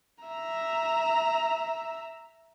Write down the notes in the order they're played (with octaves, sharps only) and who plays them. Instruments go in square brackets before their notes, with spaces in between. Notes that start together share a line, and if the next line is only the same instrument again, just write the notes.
[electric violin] E5 A#5